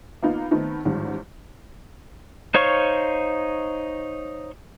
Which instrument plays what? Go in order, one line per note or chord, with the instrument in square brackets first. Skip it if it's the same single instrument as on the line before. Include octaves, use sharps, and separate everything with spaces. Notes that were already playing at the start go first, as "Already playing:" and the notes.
[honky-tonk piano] A#3 B3 D#4 F4
D#3 A3 B3 C4 D#4
A1 G#2 D#3 F3 G3
[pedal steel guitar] D#4 C5 C#5 F5 C#6